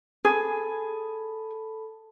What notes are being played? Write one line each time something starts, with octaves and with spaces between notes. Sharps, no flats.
G#4 A4 A5 B5